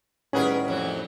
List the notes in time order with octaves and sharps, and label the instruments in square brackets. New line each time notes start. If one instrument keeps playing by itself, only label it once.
[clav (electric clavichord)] A2 D#3 G3 [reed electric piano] C#4 F#5 [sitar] G#4 A#4 B4
[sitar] F2 E3 F#3